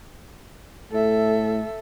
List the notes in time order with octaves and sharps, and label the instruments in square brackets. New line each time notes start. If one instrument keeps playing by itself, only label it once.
[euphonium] A2 [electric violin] A4 E5